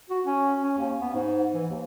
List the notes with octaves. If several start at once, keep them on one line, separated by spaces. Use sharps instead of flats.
F#4
C#4
C#4
D#2
B3
G#2
E3
D#2